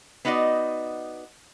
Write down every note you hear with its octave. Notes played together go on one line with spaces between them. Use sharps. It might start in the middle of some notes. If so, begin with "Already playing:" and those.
B3 D#4 F#4 D5 D#5